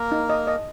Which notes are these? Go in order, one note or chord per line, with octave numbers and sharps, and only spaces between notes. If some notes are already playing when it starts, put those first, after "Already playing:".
Already playing: A#3 A#4
D#4
D#5
D#5